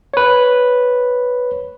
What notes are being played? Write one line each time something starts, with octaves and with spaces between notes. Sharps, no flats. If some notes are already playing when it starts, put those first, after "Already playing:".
B4 C#5